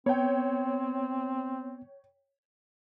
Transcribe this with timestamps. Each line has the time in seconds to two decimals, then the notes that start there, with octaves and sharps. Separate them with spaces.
0.06 B3 C4 C#5 G5